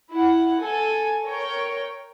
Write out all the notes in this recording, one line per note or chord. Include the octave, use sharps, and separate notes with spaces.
E4 F#5
A4 G#5
A#4 C#5 G5